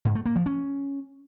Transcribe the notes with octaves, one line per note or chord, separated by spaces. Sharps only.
G#2
A3
A#3
F3
C#4